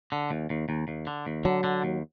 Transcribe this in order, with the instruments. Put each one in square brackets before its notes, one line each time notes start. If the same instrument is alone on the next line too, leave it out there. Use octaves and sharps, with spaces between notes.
[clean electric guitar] D3
D#2
D#2
D#2
D#2
D3
D#2
[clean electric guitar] D3 [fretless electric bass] F#3
[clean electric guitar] D3
D#2